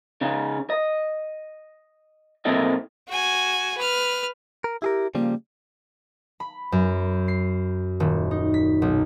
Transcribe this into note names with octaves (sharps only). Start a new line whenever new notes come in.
C#3 C#4 D#4
D#5
B1 A#3 C4 E4 A4 D#5
F#4 G#5
B4 F6
A#4
E4 G4 G#4 A#4
C#3 F3 G3 A#3
B5
F#2
C7
D#1
D#4
B6
B1